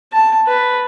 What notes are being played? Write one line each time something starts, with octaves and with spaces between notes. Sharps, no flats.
A5
B4